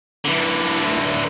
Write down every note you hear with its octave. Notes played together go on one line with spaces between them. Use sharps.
D3 E3